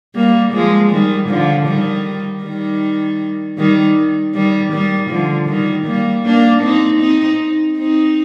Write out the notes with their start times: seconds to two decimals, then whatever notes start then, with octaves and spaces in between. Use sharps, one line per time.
0.15 G3 A#3
0.53 F3 G#3
0.92 D#3 G3
1.29 D3 F3
1.68 D#3 G3
2.44 D#3 G3
3.58 D#3 G3
4.34 D#3 G3
4.73 D#3 G3
5.10 D3 F3
5.48 D#3 G3
5.87 G3 A#3
6.25 A#3 D4
6.62 C4 D#4
7.01 C4 D#4
7.77 C4 D#4